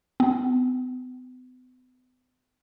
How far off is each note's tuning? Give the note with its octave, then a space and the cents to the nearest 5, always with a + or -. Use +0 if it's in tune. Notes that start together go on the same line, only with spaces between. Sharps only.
B3 +40